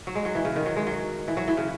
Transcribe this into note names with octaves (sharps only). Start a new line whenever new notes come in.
F#3
G#3
F#3
E3
C#3
D#3
F#3
G#3
F#3
E3
F#3
E3
C#3